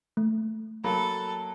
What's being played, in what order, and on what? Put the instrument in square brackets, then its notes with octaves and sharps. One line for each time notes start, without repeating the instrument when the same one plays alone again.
[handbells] A3
[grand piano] F#3 A#3 [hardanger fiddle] A4 [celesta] B5